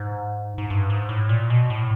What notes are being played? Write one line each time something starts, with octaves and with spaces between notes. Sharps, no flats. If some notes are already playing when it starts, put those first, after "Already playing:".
Already playing: G#2
G#2
G2
G#2
A2
A#2
B2
A2